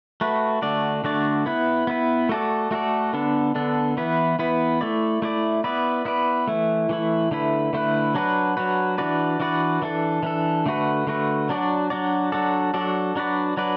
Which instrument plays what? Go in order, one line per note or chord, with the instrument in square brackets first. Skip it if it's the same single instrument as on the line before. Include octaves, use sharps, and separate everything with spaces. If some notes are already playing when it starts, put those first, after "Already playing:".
[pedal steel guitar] A3 F#4 B4
D3 A3 D4 F#4 D5
D3 A3 D4 F#4 D5
B3 E4 B4
B3 E4 B4
A3 F#4 A4 D5
A3 F#4 A4 D5
D3 B3 D4 A4
D3 B3 D4 A4
E3 B3 E4 B4
E3 B3 E4 B4
A3 E4 D5
A3 E4 D5
B3 E4 B4 D5
B3 E4 B4 D5
E3 A3 E4
E3 A3 E4
D3 A3 E4 B4
D3 A3 E4 B4
F#3 D4 F#4 B4
F#3 D4 F#4 B4
E3 D4 F#4 B4 D5
E3 D4 F#4 B4 D5
E3 D4 A4
E3 D4 A4
D3 A3 F#4 B4
D3 A3 F#4 B4
F#3 D4 F#4 D5
F#3 D4 F#4 D5
F#3 D4 F#4 A4 D5
F#3 D4 F#4 A4 D5
F#3 D4 F#4 B4 D5
F#3 D4 F#4 B4 D5